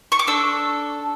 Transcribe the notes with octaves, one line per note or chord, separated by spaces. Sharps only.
C#6
D6
D4 A4 E6